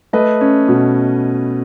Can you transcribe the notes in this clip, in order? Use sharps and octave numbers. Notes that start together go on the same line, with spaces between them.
A3 B4 D#5
C#4
B2